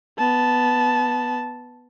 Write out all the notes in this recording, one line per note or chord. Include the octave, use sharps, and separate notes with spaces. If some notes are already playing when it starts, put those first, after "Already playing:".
B3 A5